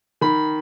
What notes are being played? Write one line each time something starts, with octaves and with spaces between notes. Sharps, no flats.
D#3 B5